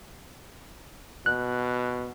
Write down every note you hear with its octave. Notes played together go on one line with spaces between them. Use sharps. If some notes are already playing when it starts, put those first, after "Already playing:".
B2 F#6